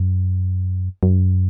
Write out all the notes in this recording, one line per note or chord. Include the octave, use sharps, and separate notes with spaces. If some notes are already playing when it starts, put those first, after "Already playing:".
Already playing: F#2
F#2